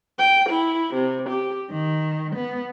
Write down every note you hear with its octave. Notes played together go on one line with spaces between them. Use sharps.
G5
E4
C3
G4
D#3
B3